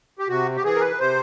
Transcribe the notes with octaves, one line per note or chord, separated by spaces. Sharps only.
G4
C3 F#4
G4
E3 G#4
A#4
B4
C3 C5